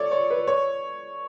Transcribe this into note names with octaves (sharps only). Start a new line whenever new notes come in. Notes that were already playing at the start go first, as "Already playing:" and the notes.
Already playing: A4 C#5 D5
C#5
B4
C#5